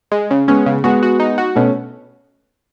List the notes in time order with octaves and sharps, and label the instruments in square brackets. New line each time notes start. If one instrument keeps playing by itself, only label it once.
[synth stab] G#3
C#3
[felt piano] G#3 B3 [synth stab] C#4
[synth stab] C#3
[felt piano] G#3 B3 [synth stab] F#4
[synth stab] F#4
D#4
F#4
[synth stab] B2 [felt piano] A3 C#4